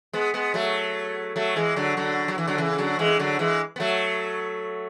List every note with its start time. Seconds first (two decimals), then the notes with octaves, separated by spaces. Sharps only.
0.13 G#3 B3
0.34 G#3 B3
0.54 F#3 A3
1.36 F#3 A3
1.56 E3 G#3
1.76 D3 F#3
1.97 D3 F#3
2.28 F#3
2.38 E3
2.48 D3 F#3
2.58 C#3 E3
2.78 D3 F#3
2.99 E3 G#3
3.19 D3 F#3
3.39 E3 G#3
3.76 B3
3.80 F#3 A3